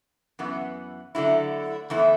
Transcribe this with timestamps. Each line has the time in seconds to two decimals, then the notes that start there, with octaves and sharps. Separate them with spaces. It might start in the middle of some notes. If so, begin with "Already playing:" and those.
0.39 F#2 E3 B3
1.15 D3 F#3 A3 E4
1.90 E2 E3 A3 E4